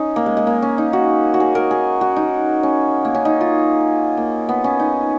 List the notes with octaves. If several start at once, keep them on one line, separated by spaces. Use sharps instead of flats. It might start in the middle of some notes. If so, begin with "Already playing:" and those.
Already playing: C#4 D#4
A#3
G#3
G#3
A#3
C#4
D#4
F#4
F#4
G#4
A#4
G#4
F#4
D#4
C#4
A#3
C#4
D#4
F4
A#3
B3
C#4
D#4